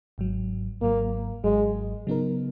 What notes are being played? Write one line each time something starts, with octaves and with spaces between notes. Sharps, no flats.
G#1 G#2 F#3
G#1 G#2 F#3 A#3
G#1 G#2 F#3 G#3
C#3 F#3 B3 D#4 A#4